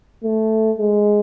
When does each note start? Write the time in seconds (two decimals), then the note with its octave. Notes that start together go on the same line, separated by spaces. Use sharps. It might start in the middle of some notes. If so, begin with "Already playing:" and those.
0.24 A3
0.78 G#3